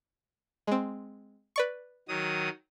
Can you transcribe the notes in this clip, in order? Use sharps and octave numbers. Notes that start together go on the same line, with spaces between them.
G#3 C4
B4 D5 C#6
D#3 F#3 D#6